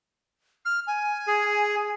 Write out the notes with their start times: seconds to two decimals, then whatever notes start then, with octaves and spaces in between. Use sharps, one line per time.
0.65 F6
0.87 G#5
1.27 G#4